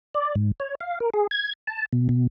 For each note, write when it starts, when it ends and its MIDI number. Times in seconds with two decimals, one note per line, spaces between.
0.15 0.35 74
0.35 0.52 44
0.60 0.75 73
0.80 0.99 77
1.00 1.10 70
1.14 1.27 68
1.31 1.53 92
1.67 1.86 81
1.93 2.08 47
2.09 2.27 47